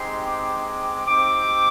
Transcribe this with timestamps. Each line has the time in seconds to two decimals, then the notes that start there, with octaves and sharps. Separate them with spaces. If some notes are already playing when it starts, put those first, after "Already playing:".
Already playing: G#3 C4 D#4 G4 C6
0.23 D6
1.04 C4 D#4 G4 D6